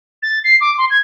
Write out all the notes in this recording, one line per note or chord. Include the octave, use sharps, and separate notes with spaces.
A6
C7
D6
C6
G#6